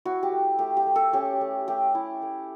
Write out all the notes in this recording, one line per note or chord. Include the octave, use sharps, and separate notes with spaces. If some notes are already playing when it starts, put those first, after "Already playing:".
E4 F#4
G4
A3
A3 G4
G4
A3
A4
C#4 G4
A3
A3 G4
E4
A3